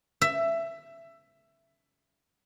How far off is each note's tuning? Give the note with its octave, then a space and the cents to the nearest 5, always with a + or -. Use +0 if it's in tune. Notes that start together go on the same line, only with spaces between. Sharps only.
E5 +15